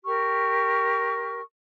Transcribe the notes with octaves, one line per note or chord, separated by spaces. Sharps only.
G4 A#4 C#6 F6